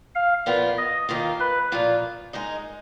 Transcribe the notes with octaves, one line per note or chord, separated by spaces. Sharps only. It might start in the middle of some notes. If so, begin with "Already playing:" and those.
F5
A#2 F3 B3 F4 A#4
D#5
D#2 D#3 A#3 F4
B4
A#2 F3 A#3 F4
G#3 D#4 A#4 D#5